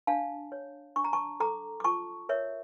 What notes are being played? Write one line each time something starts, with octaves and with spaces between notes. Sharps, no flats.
D4 F5 A5
C#5
D4 C#6
A#5
A5 C#6
A4 A#5 D6
D6
F4 A5 C#6
A#4 C#5 E5